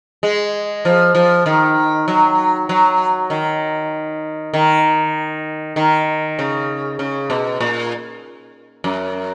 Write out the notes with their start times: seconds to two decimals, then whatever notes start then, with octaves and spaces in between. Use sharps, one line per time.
0.23 G#3
0.85 F3
1.15 F3
1.46 D#3
2.08 F#3
2.69 F#3
3.30 D#3
4.54 D#3
5.76 D#3
6.39 C#3
6.99 C#3
7.30 B2
7.61 A#2
8.84 F#2